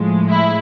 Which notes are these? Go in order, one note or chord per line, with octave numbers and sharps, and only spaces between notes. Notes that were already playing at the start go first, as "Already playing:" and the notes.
Already playing: A2 F3 G#3
E4